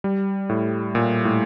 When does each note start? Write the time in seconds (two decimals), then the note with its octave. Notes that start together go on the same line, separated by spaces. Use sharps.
0.04 G3
0.49 A2
0.95 A#2
1.25 A2